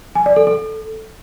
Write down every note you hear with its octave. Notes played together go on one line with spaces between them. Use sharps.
G#5
D5
A4
A4